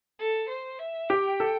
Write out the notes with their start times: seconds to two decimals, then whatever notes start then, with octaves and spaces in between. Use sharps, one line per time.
0.19 A4
0.48 C5
0.79 E5
1.09 G4 G5
1.40 A4